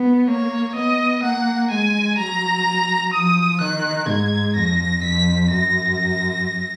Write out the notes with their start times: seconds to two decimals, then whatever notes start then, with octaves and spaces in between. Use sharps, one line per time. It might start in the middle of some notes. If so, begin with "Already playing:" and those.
Already playing: B3
0.28 A#3 C#5
0.75 B3 D#5
1.23 A#3 F#5
1.70 G#3 G#5
2.18 F#3 A#5
3.13 F3 D#6
3.60 D#3 F#6
4.08 G#2 G#6
4.56 F2 A#6
5.03 F2 B6
5.51 F#2 A#6